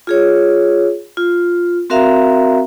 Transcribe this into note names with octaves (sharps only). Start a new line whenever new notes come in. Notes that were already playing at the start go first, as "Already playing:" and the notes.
F4 G#4 C#5
F4
C4 F#4 A#4 E5 F5 A#5